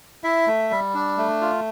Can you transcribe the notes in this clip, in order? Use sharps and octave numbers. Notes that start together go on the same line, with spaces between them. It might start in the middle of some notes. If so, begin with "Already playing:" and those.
E4 E5
A3
G3
D4
A3
F4